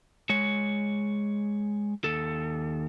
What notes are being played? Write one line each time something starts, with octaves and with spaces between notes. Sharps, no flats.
G#3 C#5
D#2 A4